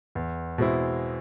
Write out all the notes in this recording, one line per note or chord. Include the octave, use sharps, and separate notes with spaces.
E2
B2 G#3 C4 E4